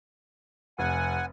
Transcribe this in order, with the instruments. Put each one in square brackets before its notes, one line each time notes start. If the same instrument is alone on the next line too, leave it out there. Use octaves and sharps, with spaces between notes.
[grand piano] F1 [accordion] F#5 G#5